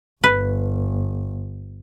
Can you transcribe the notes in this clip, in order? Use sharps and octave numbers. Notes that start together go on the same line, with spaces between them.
G1 B4